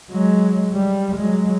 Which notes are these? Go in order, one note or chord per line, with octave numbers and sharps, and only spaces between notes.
F#3 G#3
G3
F#3 G#3